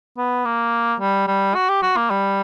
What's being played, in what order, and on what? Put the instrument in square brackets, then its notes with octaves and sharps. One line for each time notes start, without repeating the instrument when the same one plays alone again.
[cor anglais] B3
A#3
G3
G3
F#4
G4
F#4
A#3
G3